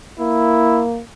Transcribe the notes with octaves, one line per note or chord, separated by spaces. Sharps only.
A#3 E4